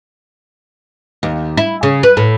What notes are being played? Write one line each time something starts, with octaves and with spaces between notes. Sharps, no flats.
D#2
E4
C#3
B4
A2